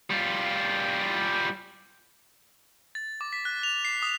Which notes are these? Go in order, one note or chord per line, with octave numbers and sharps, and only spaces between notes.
G3 F4
A6
D6
B6
F#6
F7
C7
D#6